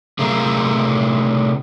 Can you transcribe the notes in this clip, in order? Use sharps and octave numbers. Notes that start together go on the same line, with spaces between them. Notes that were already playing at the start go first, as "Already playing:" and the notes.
C3 A3 G#4 A#4 F5 A#5